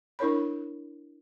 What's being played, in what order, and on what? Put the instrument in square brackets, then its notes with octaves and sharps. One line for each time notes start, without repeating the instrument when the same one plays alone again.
[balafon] D4 E4 A#4 C#5 B5